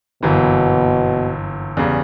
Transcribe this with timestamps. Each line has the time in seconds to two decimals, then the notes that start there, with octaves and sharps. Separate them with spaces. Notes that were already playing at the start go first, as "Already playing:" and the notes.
0.23 G1 F#2 B2 E3 A#3
1.77 E2 C#3 G3